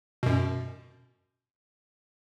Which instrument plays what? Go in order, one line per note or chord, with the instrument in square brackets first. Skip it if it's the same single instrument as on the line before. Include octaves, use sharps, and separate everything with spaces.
[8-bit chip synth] F#2 B2